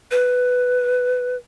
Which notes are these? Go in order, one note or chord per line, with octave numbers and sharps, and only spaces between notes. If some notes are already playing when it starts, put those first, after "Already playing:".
B4